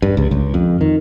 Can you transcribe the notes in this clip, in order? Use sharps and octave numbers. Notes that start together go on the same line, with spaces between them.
G2
C#2
C#2
F2
D#3